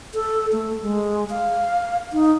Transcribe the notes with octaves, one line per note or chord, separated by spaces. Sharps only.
A4
A3
G#3
F5
D#4